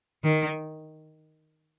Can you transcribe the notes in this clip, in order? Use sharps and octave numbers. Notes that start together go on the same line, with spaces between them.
D#3